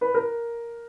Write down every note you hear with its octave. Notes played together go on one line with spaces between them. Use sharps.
B4
A#4